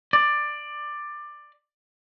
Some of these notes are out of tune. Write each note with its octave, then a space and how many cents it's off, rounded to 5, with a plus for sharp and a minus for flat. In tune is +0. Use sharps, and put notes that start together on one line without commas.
D5 +15